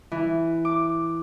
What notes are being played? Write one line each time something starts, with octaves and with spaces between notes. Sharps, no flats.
E3
D6